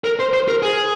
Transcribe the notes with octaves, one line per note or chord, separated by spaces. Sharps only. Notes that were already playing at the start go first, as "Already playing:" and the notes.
A#4
C5
C5
A#4
G#4